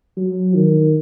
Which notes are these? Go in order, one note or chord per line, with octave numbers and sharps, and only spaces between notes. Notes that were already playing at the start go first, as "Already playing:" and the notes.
F#3
D#3